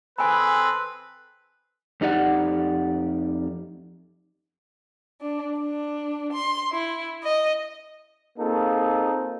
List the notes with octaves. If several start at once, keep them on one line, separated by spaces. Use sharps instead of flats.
C4 G#4 A4 B4 G#5 B5
F2 D#4 G4 D5 F#5
D4
D4
C6
E4
D#5
A#3 C4 D#4 F4 G#4 A4